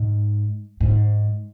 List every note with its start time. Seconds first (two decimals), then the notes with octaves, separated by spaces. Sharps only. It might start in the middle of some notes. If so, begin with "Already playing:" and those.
Already playing: G#2
0.81 G#2